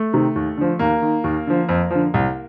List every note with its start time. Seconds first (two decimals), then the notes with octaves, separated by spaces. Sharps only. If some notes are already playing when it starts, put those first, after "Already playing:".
Already playing: A3
0.13 C3 D#3
0.36 D#2
0.58 D3 F3
0.79 D#2 A#3
1.02 D#3
1.24 D#2
1.47 D3 F3
1.69 F2
1.91 D3 F3
2.14 C2